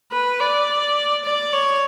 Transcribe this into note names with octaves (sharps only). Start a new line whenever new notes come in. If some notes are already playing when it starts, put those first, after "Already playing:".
B4
D5
D5
C#5